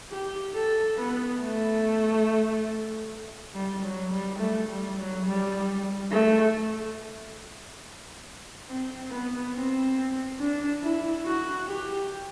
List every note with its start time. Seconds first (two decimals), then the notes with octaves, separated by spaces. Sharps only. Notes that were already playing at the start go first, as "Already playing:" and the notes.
0.11 G4
0.55 A4
0.97 B3
1.41 A3
3.55 G3
3.83 F#3
4.12 G3
4.40 A3
4.69 G3
4.98 F#3
5.26 G3
6.12 A3
8.69 C4
9.11 B3
9.55 C4
10.40 D4
10.83 E4
11.26 F#4
11.68 G4